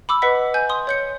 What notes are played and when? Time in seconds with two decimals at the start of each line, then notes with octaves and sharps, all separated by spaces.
0.09 B5 D6 E6
0.22 B4 D#5 F#5 B6
0.54 G#5 G6
0.69 C6 D#6
0.87 C#5 G6 C#7